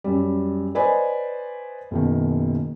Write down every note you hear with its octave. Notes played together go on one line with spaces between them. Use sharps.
F#2 G3
B4 C5 D5 D#5 G#5 B5
F#1 B2 D#3